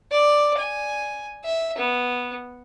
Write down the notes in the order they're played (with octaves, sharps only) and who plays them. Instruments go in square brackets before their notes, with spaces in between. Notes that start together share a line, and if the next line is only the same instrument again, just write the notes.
[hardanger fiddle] D5
G#5
E5
B3